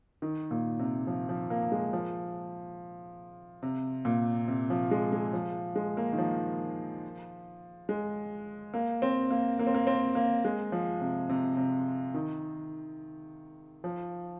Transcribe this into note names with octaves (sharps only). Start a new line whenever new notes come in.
D#3
A#2
C3
F3
F3
A#3
G#3
F3
C3
A#2
C3
F3
G#3
G#3
F3
G#3
A#3
D#3
F3
G#3
A#3
C4
A#3
A#3
C4
A#3
C4
A#3
G#3
F3
C3
C3
C3
D#3
F3